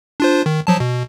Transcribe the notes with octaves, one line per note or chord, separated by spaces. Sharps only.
D4 F4 C5
D#3
F3 F#3 A5
B2